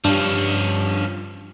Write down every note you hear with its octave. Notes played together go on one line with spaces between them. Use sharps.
G2 F3 C#4